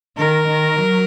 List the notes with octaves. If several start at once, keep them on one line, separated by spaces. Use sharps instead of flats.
D#3 A#4
D#3
F#3